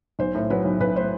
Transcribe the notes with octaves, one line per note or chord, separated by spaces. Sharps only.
B1 C5
A2
F#3 B4
B1
B1 B4
A2 C5